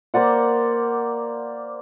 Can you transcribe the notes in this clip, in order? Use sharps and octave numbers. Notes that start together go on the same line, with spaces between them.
A#3 C5 D5 F#5